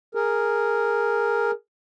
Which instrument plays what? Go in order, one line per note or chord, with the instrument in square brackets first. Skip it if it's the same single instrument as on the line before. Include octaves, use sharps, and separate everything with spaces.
[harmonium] G#4 A#4